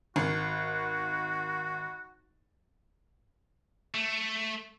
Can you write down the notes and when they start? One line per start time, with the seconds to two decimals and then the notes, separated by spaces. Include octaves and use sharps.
0.16 G#1 F#4
3.94 A3